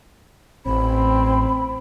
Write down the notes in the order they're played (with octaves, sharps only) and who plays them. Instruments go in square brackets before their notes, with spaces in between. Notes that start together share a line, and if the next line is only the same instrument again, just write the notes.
[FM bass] A1 [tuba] C4 [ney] B5